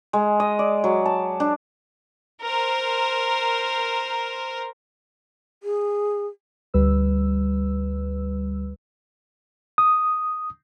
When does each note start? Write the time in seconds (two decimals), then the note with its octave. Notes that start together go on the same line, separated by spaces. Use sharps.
0.13 G#3
0.40 D#5
0.59 D5
0.84 F#3
1.05 A5
1.40 D4
2.43 A#4 C5
5.63 G#4
6.74 D2 G3 B4 E6
9.78 D#6